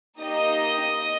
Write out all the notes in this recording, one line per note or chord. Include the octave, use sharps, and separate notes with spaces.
A#3 D#4 G4 D#5